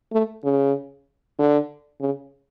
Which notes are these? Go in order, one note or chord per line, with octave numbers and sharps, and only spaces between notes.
A3
C#3
D3
C#3